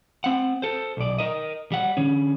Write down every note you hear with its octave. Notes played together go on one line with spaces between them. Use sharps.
C4 F#5
A4 C5
B1 D5
A#4 D#5
G3 F#5
D3 C#4